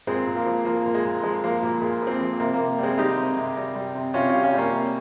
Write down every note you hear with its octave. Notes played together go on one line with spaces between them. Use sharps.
A#2 G#3 C4
A#2
A#3
F3
F3 A#3
A#2
G#3
A#2
F3 G#3
F3 A#3
A#2 A#3
A#2 G#3
F3 C4
A#3
F3
C3 A#3
A#3
C3
G3 G#3 C4
G3 D#4 G4
C3
C3
G3
G3
C3
C3 C#4 F4
C#4 F4
G3
C#4 F4
G3 A#3 C#4
C3